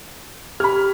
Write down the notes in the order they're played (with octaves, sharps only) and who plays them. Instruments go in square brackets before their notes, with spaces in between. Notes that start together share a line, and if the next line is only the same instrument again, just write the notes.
[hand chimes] G4 [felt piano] B5 F6